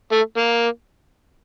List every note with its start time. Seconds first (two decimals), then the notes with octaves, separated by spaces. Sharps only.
0.12 A3
0.37 A#3